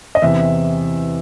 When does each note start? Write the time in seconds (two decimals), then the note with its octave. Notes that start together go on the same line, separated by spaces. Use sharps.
0.15 D#5
0.22 E2 C3 E3 E5